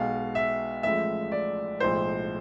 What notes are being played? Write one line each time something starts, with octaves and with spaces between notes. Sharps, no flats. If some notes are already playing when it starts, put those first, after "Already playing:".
Already playing: B1 B2 G#3 F5
E5
A1 A2 F3 G#3 E5
D5
B1 A2 F3 G#3 C5